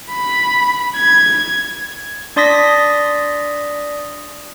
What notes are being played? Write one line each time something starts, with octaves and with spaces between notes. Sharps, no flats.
B5
G#6
D4 D5 C6 D#6 A#6 B6